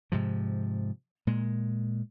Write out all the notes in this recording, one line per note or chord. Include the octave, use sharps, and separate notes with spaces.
G#2 C3 F3
A#2 G#3